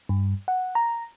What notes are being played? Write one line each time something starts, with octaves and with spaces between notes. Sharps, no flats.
G2
F#5
A#5